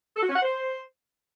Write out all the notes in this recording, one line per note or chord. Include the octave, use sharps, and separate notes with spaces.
A4
F#4
C#4
F#5
C5